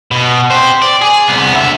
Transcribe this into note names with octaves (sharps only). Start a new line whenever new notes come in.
B2
G4 C5
D5
G#4
C2 B3
D2 E5